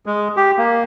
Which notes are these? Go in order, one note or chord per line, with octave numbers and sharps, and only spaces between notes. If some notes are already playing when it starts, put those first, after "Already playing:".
G#3
G4
A#3